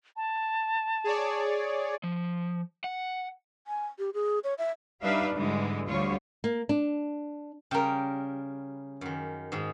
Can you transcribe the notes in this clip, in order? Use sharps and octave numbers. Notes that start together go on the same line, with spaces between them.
A5
G#4 C#5 D5
F3
F#5
G#5
G4
G#4
C#5
E5
G3 D4 D#4 B4 E5 F5
G#2 D3 E3 G3 G#3
D2 D3 G3 F4 C#5
A#3
D4
C#3 G3 A#4 G5
F#2 D#3
G#2 D#3 G#3